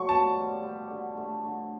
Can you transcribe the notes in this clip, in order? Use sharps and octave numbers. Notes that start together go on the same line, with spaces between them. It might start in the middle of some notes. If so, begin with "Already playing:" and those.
Already playing: F#3 A3 C#6
B2 A5
G3
G3
D3
A3
D3